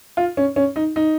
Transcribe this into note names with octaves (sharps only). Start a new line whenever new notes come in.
F4
C#4
C#4
D#4
D#4